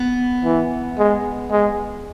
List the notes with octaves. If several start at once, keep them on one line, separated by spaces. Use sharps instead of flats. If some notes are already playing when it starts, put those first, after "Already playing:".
Already playing: B3
E3
G#3
G#3